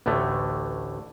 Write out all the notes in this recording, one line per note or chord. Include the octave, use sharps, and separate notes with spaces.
A1 D2 A2 D3 A3